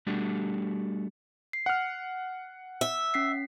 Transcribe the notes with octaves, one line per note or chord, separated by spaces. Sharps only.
G3 A3 D4 F#4 G4 A4
C7
F#5 F6
E5
C#4 B6 C7